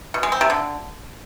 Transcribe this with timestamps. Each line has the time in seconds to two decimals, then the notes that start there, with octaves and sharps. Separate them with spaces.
0.14 B2
0.23 G#3
0.32 C4
0.41 C3
0.50 D3